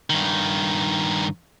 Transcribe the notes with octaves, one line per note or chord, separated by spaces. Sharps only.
G2 D#3